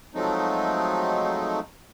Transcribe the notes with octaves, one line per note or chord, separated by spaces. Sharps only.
F3 F#3 G#3 A3 C4 D#4